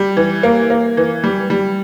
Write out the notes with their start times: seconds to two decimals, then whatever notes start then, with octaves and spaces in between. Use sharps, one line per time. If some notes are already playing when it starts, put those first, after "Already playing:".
Already playing: G3
0.17 E3
0.43 A#3
0.70 A#3
0.97 E3
1.24 G3
1.50 G3